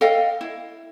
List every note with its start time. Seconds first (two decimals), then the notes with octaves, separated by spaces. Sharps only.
0.01 A4 D#5 F5 G5
0.41 E4